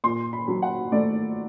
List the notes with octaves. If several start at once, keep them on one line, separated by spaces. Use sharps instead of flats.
A#2 C6
B5
F#3
F#5
A3 D5